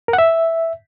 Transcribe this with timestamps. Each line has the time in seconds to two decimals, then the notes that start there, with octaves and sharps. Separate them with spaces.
0.08 A#4
0.13 F#5
0.18 E5